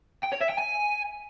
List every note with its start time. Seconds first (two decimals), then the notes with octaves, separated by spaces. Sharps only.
0.23 G5
0.32 C#5
0.41 E5
0.49 G5
0.58 G#5